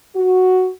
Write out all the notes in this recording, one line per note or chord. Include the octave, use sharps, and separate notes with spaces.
F#4